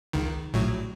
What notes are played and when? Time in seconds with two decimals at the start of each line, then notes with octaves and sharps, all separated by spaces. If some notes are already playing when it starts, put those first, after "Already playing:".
0.13 C#2 D#3
0.54 A#1 A2 F#3